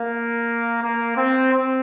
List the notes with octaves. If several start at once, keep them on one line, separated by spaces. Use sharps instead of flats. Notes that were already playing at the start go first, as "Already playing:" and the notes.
Already playing: A#3
A#3
C4
C4